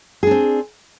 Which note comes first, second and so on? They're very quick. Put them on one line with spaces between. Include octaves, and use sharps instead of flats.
G#4 D4 C4